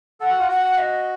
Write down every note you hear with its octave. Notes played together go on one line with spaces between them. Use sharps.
A4 F#5
F#4
F4
F#4 F#5
D#5